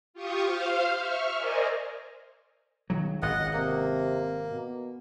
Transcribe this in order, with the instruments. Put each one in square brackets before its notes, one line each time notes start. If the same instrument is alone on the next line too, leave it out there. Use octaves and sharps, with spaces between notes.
[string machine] F4 G4 C#6 D#6
C5 F5 F6
E5 C#6 F6
A#4 C5 D5 D#5 G#5
[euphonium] C#2 [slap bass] D#3 E3 F#3
[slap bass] G#1 [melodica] D#5 F#5
[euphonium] C3 [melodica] A#3
[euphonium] B2